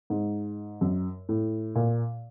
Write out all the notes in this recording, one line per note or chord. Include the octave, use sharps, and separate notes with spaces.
G#2
F#2
A2
A#2